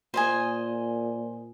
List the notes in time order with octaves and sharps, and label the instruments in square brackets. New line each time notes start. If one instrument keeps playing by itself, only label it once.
[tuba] A#2 [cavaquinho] C5 D#5 G#5